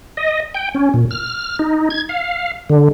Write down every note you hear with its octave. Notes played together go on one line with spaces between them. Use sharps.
D#5
G5
C#4
A#2
F6
D#4
G#6
F5
D3